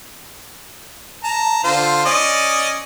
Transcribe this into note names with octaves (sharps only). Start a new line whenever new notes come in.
A5 A#5
D3 F4 C5
C#4 D5 D#5